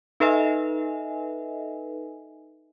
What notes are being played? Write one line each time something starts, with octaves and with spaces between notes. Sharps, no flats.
D#4 A4 B4 D#5 E5 G#5